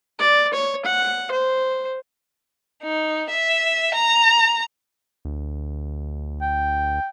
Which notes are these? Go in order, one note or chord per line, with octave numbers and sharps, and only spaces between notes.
D5
C#5
F#5
C5
D#4
E5
A#5
D2
G5